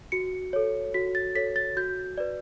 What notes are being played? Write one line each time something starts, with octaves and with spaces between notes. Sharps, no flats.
F#4 C#7
A4 C#5
F#4 B6
A6
A4 C#5 B6
A6
F#4 G6
B4 D5